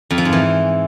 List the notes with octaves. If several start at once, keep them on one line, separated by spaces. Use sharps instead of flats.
F2
F3
G#2
E3